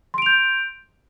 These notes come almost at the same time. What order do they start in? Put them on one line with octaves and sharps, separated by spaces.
C6 D7 F7 G6